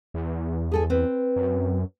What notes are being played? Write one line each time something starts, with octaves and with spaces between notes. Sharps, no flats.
E2
G#4 A4 G#5
C4 B4
F#2